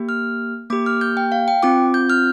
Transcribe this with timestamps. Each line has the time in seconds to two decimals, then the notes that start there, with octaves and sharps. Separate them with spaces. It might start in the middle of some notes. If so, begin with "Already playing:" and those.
Already playing: A#3 G4
0.09 F6
0.70 A#3 G4 D6
0.86 F6
1.01 G6
1.17 G5
1.32 F5
1.48 G5
1.63 C4 F4 D6
1.94 G6
2.10 F6